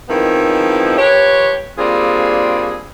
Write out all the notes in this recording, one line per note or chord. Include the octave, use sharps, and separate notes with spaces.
D#3 F3 G#3 B3 C4 E4
F3 G4 B4 C#5
G3 A#3 C4 D4 F4 G#4